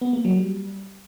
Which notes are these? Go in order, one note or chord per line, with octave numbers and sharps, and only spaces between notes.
B3
A#3
F#3
G3